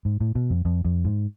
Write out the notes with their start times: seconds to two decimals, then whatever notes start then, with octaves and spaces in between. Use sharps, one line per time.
0.05 G#2
0.21 A2
0.35 B2
0.50 F2
0.65 F2
0.85 F2
1.05 G#2